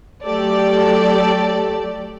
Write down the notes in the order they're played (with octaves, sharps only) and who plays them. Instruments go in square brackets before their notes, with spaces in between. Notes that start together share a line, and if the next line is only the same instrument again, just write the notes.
[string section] F#3 A3 G4 A4 D5